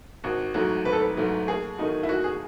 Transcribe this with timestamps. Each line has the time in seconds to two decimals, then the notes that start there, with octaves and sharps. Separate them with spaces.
0.24 G#1 F#4
0.54 G#2 F#3 A3 F#4
0.85 G#1 B4
0.93 A4
1.01 B4
1.17 G#2 F#3 A3
1.47 D#2 G#4
1.78 D#3 A3 D#4 F#4
2.03 E4
2.09 D#2 F#4
2.24 G#4